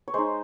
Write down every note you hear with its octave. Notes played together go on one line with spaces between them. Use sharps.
C#5
G#3 D#4 C5